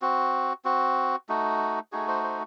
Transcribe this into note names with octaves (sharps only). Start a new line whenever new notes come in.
C4 F#4
C4 F#4
A3 D#4 F#4
A3 D#4 F#4 G#4
C5
C5